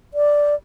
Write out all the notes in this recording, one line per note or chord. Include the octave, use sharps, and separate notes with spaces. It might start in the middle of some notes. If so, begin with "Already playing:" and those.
D5